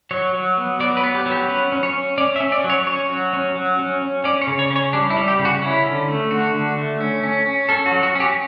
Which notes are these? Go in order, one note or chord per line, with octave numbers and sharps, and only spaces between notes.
F#3 C#5
F#3
B3
F#3 D5
B4
B3
G4
F#3
G4
C#4 B4
C#4
C#5
C#4
C#4 D5
E5
C#4
D5
F#3
C#5
C#4 C#5
F#3
C#4
F#3
C#4
C#4
C#4 D5
C#5
C#3
C#5
C#4
C#5
G3 D4
E4
G3
G4
C#3
F#4
C#4 E4
D3
A3
D3 F#4
D3
A3
C#4
C#4
C#4
C#4 A4
F#4
F#3
F#4
C#4 G4